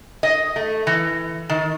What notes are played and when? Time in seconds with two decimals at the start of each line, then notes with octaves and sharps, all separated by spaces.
0.23 D#5
0.56 A3
0.87 E3
1.50 D#3